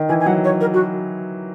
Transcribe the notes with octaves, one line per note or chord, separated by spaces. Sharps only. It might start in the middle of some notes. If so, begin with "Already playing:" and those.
Already playing: D#3
E3 G#5
G#5
F#3 F#5
C#5
A#4
F#4